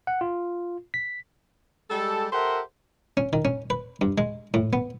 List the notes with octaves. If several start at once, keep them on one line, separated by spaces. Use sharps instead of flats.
F#5
F4
B6
G3 G#3 G4 A4
G4 A4 A#4 C5 E5 F#5
C#4
D#3
C#4
B4
G2
G#3
A2
B3